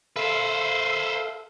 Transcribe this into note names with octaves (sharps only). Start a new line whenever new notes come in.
A4 B4 C5 E5 F5